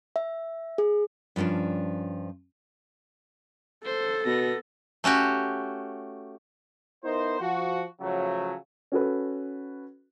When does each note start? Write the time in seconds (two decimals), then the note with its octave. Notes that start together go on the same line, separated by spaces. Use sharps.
0.16 E5
0.78 G#4
1.36 G2 F3 A#3 C#4 D4
3.85 A4 C5
4.26 B2 B3 A#6
5.04 A3 C#4 F#4 G4
7.04 B3 D#4 E4 A#4 C5
7.41 F3 F#4
8.01 C#3 F3 F#3 A3
8.92 C#4 F#4 A4 B4